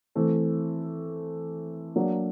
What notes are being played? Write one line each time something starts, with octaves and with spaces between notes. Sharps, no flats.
E3 A3 C4
F#3 A#3 D4